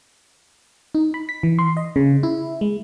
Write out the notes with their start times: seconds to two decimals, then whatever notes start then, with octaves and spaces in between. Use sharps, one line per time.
0.95 D#4
1.14 B5
1.29 B6
1.43 E3
1.59 C6
1.77 D#5
1.96 C#3
2.23 E4
2.61 G#3